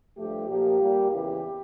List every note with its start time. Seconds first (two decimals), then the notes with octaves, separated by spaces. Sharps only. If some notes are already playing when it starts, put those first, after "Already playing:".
0.17 G2 F3 A3 G4
0.48 A#2 F3 A#3 G4
0.79 A#2 G3 A#3
1.10 E2 C#3 E3 G4